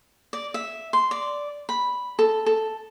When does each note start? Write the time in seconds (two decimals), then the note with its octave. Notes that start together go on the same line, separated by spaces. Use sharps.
0.33 D5
0.54 E5
0.93 C6
1.11 D5
1.69 B5
2.19 A4
2.46 A4